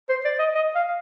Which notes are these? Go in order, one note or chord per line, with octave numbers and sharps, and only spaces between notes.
C5
D5
D#5
D#5
F5